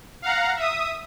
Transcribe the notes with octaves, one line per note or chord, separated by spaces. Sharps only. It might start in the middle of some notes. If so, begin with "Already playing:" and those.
F5 F#5 A#5
E5 D#6